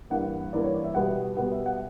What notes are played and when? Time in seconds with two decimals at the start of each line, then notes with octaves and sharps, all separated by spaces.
0.10 G2 E3 A#3 F#5
0.53 G2 E3 A#3 D5
0.63 C#5
0.74 D5
0.84 E5
0.95 B2 G3 B3 F#5
1.37 B2 G3 B3 F#5
1.52 E5
1.66 F#5